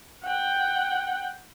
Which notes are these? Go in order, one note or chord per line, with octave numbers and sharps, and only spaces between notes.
F#5 G5